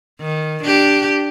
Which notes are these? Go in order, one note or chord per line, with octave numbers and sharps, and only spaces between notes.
D#3
D4 G4